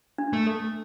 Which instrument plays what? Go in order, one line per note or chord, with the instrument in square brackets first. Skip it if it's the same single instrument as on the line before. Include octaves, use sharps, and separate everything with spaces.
[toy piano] D4
[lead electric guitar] A3
[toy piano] A4